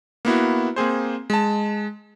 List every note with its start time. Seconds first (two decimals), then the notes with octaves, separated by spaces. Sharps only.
0.25 A#3 B3 E4 F#4
0.76 A#3 C4 G#4 C5
1.30 G#3 A5